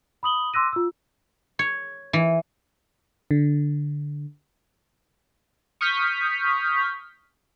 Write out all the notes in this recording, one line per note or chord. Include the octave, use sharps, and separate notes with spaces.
B5 D#6 F#7 G7
C6 D6 E6 F#6 A#6 D#7
F4 E6
C#5
E3
D3
C#6 D#6 F6 G6 B6